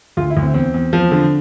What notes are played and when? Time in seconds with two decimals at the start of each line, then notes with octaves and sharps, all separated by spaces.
0.17 D2 F4
0.30 E4
0.37 D2
0.43 C4
0.54 E2 C4
0.74 E2
0.93 F3
1.11 D3